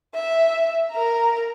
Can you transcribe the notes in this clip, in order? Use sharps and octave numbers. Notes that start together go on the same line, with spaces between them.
E5
A#4 A#5